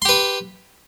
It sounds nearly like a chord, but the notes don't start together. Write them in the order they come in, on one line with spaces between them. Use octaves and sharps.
C6 G4 B4